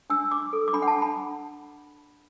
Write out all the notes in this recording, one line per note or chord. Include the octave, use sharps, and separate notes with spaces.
D4 E6
D4 D6
A4
D6
D4 B5
F#5
A5
D4
B5